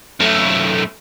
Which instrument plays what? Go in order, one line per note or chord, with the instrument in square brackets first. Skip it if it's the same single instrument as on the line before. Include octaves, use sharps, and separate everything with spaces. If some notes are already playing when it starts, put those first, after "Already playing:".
[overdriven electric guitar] F#2 A3